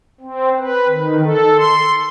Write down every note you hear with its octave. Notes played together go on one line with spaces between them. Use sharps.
C4
B4
D#3
A4
C6